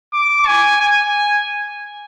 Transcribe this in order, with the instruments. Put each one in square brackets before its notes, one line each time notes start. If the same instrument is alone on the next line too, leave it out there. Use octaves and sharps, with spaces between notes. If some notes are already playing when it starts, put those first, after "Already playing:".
[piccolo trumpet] D6
G#5
G#5